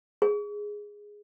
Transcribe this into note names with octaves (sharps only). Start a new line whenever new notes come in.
G#4